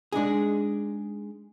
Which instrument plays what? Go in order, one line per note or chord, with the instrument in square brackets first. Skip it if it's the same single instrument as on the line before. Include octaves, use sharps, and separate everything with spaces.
[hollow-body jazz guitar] G#3 D4 D#4 G#4